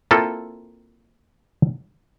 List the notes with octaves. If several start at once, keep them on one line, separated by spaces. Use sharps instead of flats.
A#3 C4 E4 F4 A4